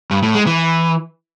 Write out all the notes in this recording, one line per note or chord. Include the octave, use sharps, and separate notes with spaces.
G2
A2
G#3
E3